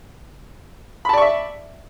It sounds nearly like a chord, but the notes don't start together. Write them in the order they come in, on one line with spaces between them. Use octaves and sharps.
B5 A5 D5 C#6 E5